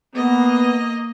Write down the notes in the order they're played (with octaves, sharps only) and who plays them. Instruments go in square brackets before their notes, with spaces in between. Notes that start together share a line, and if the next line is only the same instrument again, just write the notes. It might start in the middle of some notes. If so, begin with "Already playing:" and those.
[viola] A#3 D#5 [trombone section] B3